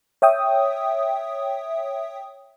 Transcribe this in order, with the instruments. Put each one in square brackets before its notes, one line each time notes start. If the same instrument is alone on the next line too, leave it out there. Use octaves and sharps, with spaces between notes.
[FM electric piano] C#5 E5 G5 D#6